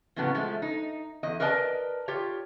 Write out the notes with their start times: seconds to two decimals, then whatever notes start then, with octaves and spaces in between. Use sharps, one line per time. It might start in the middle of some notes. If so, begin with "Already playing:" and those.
0.16 F2 A2 C#3 F#3 B3 A5
0.35 F3 G#3 A3
0.62 D#4
1.23 E2 D#5
1.40 A#4 B4 D5 D#5 G5 A5
2.08 F4 G4 C#5